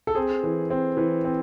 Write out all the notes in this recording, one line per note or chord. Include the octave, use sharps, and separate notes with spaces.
A4
C4 G#4
E3
C4
E3
C4